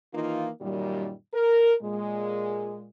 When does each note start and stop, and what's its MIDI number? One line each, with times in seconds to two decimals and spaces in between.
0.14 0.49 51
0.14 0.49 52
0.14 0.49 58
0.14 0.49 63
0.14 0.49 65
0.61 1.13 42
0.61 1.13 46
0.61 1.13 51
0.61 1.13 55
1.34 1.75 70
1.82 2.88 46
1.82 2.88 56